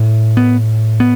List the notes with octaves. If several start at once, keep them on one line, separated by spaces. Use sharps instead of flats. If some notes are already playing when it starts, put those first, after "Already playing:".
Already playing: A2
B3
B3